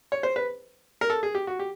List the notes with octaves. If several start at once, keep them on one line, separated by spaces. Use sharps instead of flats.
C#5
C5
B4
A#4
A4
G#4
G4
F#4
G4